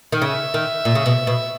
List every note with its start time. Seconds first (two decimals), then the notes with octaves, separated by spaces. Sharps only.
0.12 D#3
0.22 C#3 E5
0.54 D#3
0.85 A#2
0.95 C#3
1.06 B2
1.27 B2